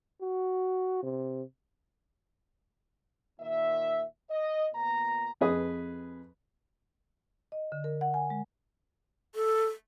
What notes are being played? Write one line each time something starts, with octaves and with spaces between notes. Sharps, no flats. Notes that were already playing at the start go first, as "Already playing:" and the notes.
F#4
C3
A#2 D#3 E5
D#5
A#2 B3 A#5
F2 G#4 B4 D#5 D#6
D#5
D3
A#4
F#5
G#5
G#3
A4